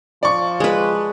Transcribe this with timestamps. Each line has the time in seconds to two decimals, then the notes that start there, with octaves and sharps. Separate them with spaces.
0.23 F3 D5 C#6
0.60 G#3 B4